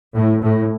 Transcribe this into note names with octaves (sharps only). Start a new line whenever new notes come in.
A2
A2